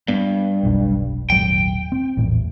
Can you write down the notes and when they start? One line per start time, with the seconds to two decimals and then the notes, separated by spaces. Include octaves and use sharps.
0.08 G2 B3
0.63 F1 B1 D4
1.30 D#1 G#1 F#3 G5
1.92 C4
2.17 A#1 E2 A2